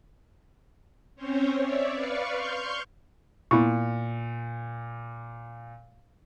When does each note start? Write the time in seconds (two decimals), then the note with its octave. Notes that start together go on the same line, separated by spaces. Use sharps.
1.16 C4 C#4 C5 C#5
1.58 C#5 D5 E5
1.92 B4 D5 F5 C#6
2.33 C6 C#6 F6 G6
3.51 A#2 B3 E4 C#6